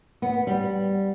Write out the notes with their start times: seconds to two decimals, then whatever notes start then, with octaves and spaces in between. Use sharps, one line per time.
0.22 B3
0.47 G3